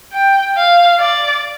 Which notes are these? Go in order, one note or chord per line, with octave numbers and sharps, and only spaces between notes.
G5
F5
D5